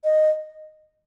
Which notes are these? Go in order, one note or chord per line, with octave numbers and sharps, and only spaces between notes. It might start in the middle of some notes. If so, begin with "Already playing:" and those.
D#5